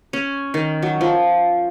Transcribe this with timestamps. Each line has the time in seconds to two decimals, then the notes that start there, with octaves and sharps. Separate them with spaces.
0.13 C#4
0.54 D#3
0.82 F#3
1.01 F3